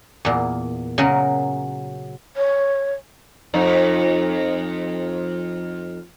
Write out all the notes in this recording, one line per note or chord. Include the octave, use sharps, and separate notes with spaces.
E2 A#2
C#3 F#3 C#4 A#4
C#5
F2 D#4